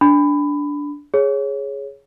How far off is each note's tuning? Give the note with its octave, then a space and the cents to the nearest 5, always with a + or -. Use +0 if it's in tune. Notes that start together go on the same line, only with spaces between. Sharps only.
D4 -10 B5 +20
G#4 +0 C#5 +0